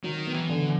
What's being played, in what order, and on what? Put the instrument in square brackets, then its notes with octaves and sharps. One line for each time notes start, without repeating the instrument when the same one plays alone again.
[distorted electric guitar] D#3 [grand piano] F#3
[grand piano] B3
[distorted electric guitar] E3
[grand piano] D3